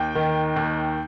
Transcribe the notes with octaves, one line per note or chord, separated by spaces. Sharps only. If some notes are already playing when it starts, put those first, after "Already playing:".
Already playing: D#2 G5
D#3
D#2